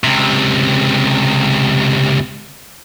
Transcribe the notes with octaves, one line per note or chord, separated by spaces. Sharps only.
C#2 C3